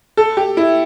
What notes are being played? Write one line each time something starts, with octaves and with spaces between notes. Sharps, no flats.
A4
G4
E4